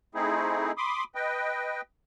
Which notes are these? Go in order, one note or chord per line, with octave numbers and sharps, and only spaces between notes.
A3 C4 D#4 E4 G#4
B5 C6 D6 D#6
B4 D#5 G5